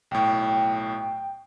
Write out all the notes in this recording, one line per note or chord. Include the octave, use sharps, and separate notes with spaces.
B1 A2 G5